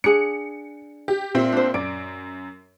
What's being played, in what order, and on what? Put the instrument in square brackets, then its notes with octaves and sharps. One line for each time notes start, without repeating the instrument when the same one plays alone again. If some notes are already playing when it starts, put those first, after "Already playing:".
[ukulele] D4 G#4 F#5 [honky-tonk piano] C#7
[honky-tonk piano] G4
A#2 C4 E5
[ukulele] D4 C5
[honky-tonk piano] F#2 D7 [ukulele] D5